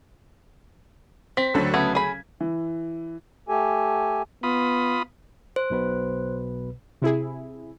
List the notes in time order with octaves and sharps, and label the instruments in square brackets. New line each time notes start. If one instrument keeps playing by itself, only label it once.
[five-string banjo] C4 [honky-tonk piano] B6
[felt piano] D2 F#3 [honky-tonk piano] D3 F#4 A4
[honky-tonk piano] C#3 G#6 [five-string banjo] A3 B3
[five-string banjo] G#4 B5
[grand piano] E3
[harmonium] A3 G4 A4 G#5
[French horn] B3 [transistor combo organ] F4 B5 D#6
[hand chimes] C5
[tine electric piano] B1 B2 B4
[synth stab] C3 E4 G#4